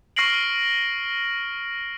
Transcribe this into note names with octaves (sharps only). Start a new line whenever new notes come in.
C#6 F6 A#6 C7 D7 F#7